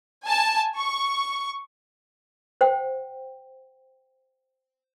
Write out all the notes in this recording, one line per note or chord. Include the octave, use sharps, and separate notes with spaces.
G#5 A5
C#6
C5 F#5 G5